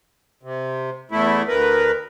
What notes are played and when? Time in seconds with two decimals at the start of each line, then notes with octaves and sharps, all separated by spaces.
0.43 C3
1.11 E2 A3 E4
1.48 D2 A#4 B4